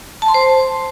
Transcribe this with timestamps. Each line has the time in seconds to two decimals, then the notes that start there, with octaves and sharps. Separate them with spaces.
0.22 A5
0.28 C6
0.34 C5